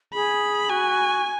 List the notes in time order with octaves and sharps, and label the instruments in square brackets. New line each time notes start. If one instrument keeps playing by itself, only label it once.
[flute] G#4 [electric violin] B5
[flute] F#4 [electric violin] G#5